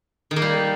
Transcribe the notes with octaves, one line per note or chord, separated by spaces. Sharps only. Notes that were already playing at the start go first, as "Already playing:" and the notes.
D#3
A#3
G3